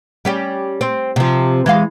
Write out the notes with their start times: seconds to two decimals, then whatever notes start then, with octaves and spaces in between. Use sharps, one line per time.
0.25 G3 C#4 G4
0.81 C4
1.16 C3 F3
1.66 E3 G#3 F5